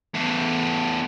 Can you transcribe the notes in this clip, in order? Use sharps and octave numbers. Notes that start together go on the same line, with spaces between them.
E2 A2